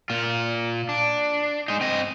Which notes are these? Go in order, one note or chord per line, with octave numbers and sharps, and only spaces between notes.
A#2 F4
D4
G#3 D#4
C4 D#5